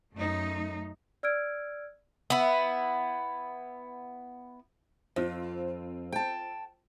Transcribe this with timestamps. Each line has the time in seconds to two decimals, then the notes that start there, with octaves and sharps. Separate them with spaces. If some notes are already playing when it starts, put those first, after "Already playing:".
0.14 F#2 A3 D#4
1.23 D5 E6 F6 G#6 D7
2.30 B3 E4
5.16 F2 C4 F4
6.12 G5 A5